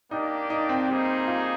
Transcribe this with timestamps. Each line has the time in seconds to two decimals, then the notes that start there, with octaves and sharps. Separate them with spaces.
0.11 A#3 D4 D#4 G4 D5 G5
0.50 D#4
0.69 C4
0.88 G3 A#3 C4 D#4 G#4 C5
1.27 F4